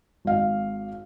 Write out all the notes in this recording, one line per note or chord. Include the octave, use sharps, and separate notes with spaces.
G#1 F5